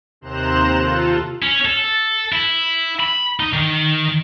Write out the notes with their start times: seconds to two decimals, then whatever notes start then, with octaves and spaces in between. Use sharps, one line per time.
0.21 D#2 C3 C5 A#5 F#6 E7
0.79 F4 A4
1.42 C#4
1.65 A4
2.32 E4
3.00 B5
3.40 D#4
3.53 D#3